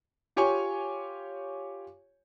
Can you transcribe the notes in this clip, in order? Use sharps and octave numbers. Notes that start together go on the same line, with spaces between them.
F4 G4 C#5 G#5 C#6